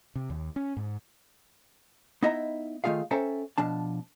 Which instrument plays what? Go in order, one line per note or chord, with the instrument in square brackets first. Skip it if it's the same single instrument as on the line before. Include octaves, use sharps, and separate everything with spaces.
[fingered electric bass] C3
D#2
C#4
G#2
[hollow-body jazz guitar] B3 D#4 E4 D#5 E5 A#5
D#3 A3 F4 G#4 F5
C#4 A4 C5 E5 G5 A#5
B2 F3 D4 A5